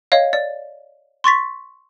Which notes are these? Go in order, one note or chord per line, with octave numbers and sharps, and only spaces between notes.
C#5 D#5 F5
D5
C6 C#6 A6 B6